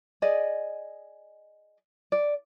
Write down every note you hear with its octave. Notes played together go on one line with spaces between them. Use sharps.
G#4 D5 D#5
D5